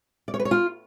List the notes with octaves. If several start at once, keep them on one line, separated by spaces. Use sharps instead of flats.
D5
C#5
B4
C#5
F4